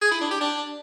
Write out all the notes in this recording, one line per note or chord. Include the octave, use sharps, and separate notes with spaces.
G#4
E4
D4
G4
D4